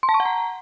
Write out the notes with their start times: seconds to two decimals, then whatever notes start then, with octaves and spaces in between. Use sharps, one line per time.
0.03 C6
0.09 A5
0.14 C#6
0.20 F#5
0.25 A#5